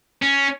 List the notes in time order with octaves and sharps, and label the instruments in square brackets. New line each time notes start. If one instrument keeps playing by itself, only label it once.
[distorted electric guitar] C#4